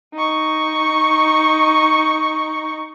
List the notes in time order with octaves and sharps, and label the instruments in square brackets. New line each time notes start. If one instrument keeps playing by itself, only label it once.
[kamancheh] D#4 C#6